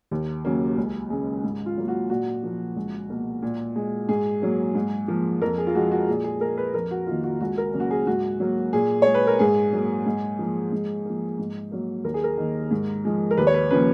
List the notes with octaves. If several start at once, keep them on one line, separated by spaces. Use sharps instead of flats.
D#2
C#3 F#3 A#3
C#2
C#3 G#3
G#2
F4
F#3 A#3
F#4
A#2 F#4
F3 A#3
C#2
B2 A#3
A#2
G#3
G#2 G#4
F#3 A#3
G#2
F3 A#3
F2 A#4
G#4
F4
F3 G#3 F#4
F#4
A#2 G#4
G#4
G#3 A#4
B4
F2 A#4
F#4
D#3 A#3 F4
F#4
C#2 F#4
A#4
C#3 F#3 A#3
F#4
G#4
G#2 F#4
F#3 A#3
A#2 G#4
G#3 C#5
B4
A#4
G#2 G#4
F#3 A#3
G#2
F3 A#3
G#2
F3 A#3
G#2
F#3 A#3
D#2 A#4
G#4
A#4
D#3 A#3
G#2
F3 G#3
A#4
D#2 B4
C#5
B4
C#3 F3 A#3 B4